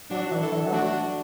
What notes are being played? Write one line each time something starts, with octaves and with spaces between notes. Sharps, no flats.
F#3 D4 F#4
E3
E4 A4
E3
F#3
A3 D4 F#4